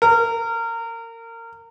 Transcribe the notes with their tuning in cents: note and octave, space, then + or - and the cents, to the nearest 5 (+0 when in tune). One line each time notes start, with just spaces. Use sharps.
A#4 -25